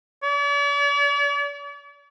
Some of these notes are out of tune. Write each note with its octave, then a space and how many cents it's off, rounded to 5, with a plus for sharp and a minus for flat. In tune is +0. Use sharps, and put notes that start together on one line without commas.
D5 -45